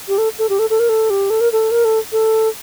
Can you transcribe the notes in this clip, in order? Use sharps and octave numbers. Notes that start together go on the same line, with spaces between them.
G4
A4
A4
G4
A4
A4
A#4
A4
G4
A4
A#4
A4
A#4
A4
A4